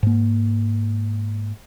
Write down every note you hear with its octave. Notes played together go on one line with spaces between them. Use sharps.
G#2 A#3